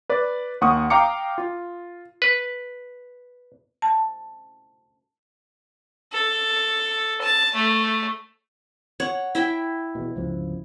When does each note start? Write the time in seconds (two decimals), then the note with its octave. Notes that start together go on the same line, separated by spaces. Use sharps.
0.10 B4 D5
0.61 D#2 F#5 C#6 D#6
0.90 F5 G5 A#5 D6 C#7
1.38 F4
2.22 B4
3.82 A5
6.12 A4
7.21 A5
7.54 A3
9.00 C#5 F#5
9.35 E4 E5 G5
9.95 E2 B2
10.16 G1 C#2 F3